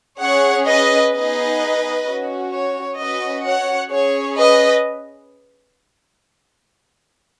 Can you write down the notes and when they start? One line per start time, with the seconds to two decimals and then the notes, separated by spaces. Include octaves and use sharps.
0.20 C#4 G#4 C#5 F#5
0.67 B4 D#5
1.13 B3 D#4 G#4 B4 D#5
2.06 C#4 F#4
2.53 C#5
2.99 C#4 F#4 B4 D#5
3.46 C#5 F#5
3.92 C#4 G#4 C#5
4.39 B4 D#5